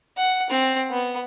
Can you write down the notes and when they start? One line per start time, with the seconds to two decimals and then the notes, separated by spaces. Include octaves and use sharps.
0.17 F#5
0.50 C4
0.90 B3